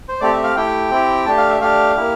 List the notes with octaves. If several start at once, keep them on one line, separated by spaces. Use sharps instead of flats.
C5
A3 C4 G4 D5
E5
F5
A3 E4 G4 G5
C4 E4 G4
A3 D4 G4 A5
F5
E5
A3 D4 G4 F5
A#3 E4 G4